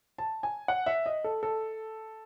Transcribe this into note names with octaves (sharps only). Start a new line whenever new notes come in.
A5
G#5
F#5
E5
D#5
A4
A4